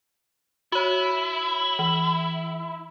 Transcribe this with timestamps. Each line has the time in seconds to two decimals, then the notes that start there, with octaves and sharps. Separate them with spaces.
0.72 E4 F#4 C#5
1.79 E3